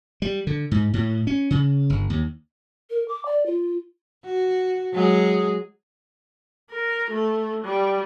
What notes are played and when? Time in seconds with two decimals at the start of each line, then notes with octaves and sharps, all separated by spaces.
0.22 G3
0.47 D3
0.71 G#2
0.94 A2
1.27 C#4
1.51 C#3
1.90 G1
2.10 D#2
2.90 A#4
3.09 D6
3.26 D5
3.46 F4
4.25 F#4
4.93 F#3 G#3 G#4
6.70 A#4
7.11 A3
7.65 G3